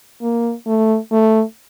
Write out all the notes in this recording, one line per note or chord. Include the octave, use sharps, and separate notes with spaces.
A#3
A3
A3